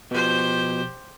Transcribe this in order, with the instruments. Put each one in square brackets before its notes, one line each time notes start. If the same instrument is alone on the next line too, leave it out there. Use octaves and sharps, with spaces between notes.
[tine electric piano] B2 F3 [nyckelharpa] G4 C5